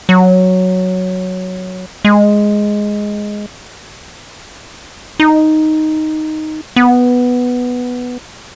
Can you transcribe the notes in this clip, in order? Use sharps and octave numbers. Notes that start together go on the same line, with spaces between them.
F#3
G#3
D#4
B3